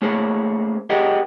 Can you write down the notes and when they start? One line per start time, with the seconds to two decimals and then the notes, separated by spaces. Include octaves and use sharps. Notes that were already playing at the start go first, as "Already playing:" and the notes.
0.02 A3 A#3 C#4 G#4 C5
0.90 G4 G#4 A#4 D#5 F#5 G5